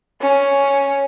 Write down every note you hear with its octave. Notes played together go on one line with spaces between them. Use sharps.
C#4